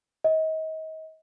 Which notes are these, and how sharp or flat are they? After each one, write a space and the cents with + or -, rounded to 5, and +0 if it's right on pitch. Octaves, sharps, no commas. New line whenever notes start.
D#5 +35